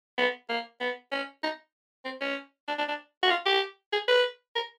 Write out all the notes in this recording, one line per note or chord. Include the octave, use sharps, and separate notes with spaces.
B3
A#3
B3
C#4
D#4
C4
C#4
D4
D4
D4
F#4
F4
G4
G#4
B4
A#4